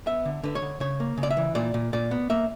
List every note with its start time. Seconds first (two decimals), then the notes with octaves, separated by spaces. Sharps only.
0.06 B3 E5
0.25 D3
0.43 D3 B4
0.55 C#5
0.62 D3
0.80 C#3 C#5
1.00 A#3
1.17 C#3
1.23 D5
1.31 E5
1.37 E3
1.55 A#2 D5
1.74 A#2
1.93 A#2 D5
2.11 B3
2.30 A#3 E5